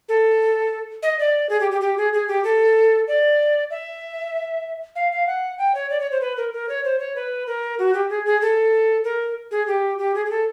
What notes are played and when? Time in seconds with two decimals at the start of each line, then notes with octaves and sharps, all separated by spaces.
0.09 A4
1.03 D#5
1.19 D5
1.49 G#4
1.60 G4
1.71 G4
1.81 G4
1.97 G#4
2.13 G#4
2.28 G4
2.44 A4
3.08 D5
3.71 E5
4.96 F5
5.12 F5
5.27 F#5
5.58 G5
5.75 C#5
5.90 D5
6.00 C#5
6.11 C5
6.21 B4
6.37 A#4
6.53 A#4
6.69 C#5
6.84 C5
6.99 C#5
7.16 B4
7.47 A#4
7.79 F#4
7.94 G4
8.10 G#4
8.26 G#4
8.41 A4
9.04 A#4
9.51 G#4
9.67 G4
9.98 G4
10.15 G#4
10.26 G#4
10.30 A4